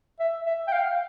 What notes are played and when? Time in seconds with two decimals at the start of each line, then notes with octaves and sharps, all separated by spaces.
0.19 E5
0.46 E5
0.68 G5
0.72 F5